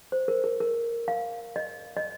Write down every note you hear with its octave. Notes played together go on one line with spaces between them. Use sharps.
C5
A#4
A#4
A#4
F5
D#5
D#5